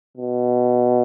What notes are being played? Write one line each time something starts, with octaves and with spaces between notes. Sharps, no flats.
B2